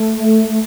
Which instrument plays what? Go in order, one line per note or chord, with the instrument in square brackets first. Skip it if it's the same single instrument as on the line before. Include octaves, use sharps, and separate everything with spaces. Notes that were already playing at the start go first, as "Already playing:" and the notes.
Already playing: [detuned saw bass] A3